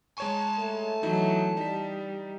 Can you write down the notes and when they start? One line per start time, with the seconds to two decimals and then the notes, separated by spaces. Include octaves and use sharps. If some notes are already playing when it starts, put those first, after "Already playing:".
0.18 G#3 C#5 G#5 A5 C#6
0.59 A3
1.03 E3 F#3 D#4 E4
1.57 G3 D#4 B6